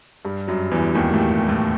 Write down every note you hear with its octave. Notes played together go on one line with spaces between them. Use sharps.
G2 G3
F#2 F#3
E2 E3
D#2 D#3
A2 A3
A2 A3